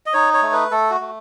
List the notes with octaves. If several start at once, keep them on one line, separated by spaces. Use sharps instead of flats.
D#5
D#4 C#5
C#5
A3
B4
A3 A4
F#4
A3